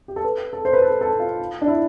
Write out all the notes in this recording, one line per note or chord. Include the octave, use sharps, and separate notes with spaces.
G4
A4
B4
A4
C5
B4
A4
A4
F4
D4
E4